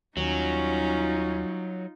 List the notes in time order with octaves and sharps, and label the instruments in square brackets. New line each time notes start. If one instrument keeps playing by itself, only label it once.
[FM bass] D#2 [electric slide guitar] F#3 [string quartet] G3 C#4 [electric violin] D#4 F4